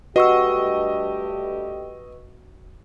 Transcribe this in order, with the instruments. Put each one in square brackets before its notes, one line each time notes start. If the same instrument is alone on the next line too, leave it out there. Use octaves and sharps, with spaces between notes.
[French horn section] G2 A3 G4 [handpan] F#4 [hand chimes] B4 C#6 E6 [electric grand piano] D#5